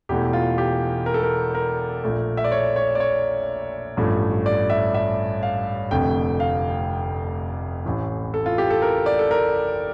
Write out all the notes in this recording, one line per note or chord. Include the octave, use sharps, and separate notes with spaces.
E1 E2 E3 A3 G4
F4
G4
A#4
A4
A#4
A#4
A#1 A#2 A3
E5
D5
C#5
C#5
D5
C#5
A1 G2 F3 A3
D5
E5
E5
F5
F1 F2 D3 A3 G5
F5
A1 A2 E3
A4
F4
G4
A4
A#4
D5
A4
A#4